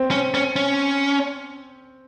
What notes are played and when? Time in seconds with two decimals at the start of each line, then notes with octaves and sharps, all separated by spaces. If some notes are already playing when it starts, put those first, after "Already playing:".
Already playing: C4
0.11 C#4
0.35 C#4
0.56 C#4